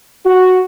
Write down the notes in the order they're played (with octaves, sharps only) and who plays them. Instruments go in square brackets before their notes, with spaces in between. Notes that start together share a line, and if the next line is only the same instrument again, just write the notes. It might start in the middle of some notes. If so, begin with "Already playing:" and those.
[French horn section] F#4